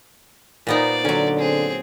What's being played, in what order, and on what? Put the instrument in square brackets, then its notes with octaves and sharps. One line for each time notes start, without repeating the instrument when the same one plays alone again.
[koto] A#2 B3 D#4 [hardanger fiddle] C5 D5
[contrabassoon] D3 [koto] F#3 C#4
[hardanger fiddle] C4 G#4